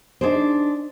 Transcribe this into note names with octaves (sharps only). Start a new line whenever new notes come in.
D4 D#4 G#4 C5